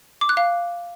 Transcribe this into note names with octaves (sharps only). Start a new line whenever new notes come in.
D6
F#6
F5